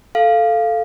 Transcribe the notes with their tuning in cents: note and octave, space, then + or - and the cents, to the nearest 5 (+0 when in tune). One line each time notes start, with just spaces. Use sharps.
A4 +0 F5 -10